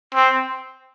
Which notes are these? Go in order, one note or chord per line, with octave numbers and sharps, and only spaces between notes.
C4